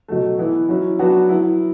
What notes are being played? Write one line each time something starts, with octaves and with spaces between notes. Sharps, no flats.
B2 F#3 A3
E3 B3 E4
F#3 C#4 E4
F#3 B3 D4 F#4
F#3 B3 E4